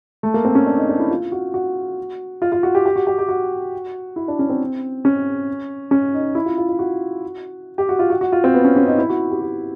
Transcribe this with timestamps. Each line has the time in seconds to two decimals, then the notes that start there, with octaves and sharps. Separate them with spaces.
0.23 A3
0.34 A#3
0.45 C4
0.55 C#4
0.67 D4
0.78 D#4
0.89 D4
0.99 E4
1.10 F4
1.32 F#4
1.54 F#4
2.42 F4
2.52 F4
2.63 F#4
2.75 G4
2.86 G4
2.96 F#4
3.07 G4
3.19 G4
3.29 F#4
4.16 E4
4.28 D4
4.39 C#4
4.49 C4
5.05 C#4
5.91 C#4
6.14 D#4
6.35 E4
6.46 F4
6.58 F4
6.69 F4
6.79 F#4
7.78 G4
7.89 F#4
7.99 F4
8.10 F#4
8.21 F#4
8.32 F4
8.44 C4
8.54 B3
8.65 C#4
8.76 C#4
8.87 D#4
8.98 E4
9.10 F#4
9.31 G4
9.42 F#4